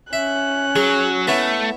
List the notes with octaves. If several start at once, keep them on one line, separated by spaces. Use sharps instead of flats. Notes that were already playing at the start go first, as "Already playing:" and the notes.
C#4 E5 F#6
F#3 G#4
A3 B3 E4 C#5